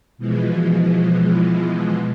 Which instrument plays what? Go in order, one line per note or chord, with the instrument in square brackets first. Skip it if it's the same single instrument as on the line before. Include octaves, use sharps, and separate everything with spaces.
[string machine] B2 E3 F3 G#3